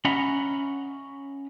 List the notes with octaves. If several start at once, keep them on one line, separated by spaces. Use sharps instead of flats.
C#4 D#5 E5 F#5 A#5 B5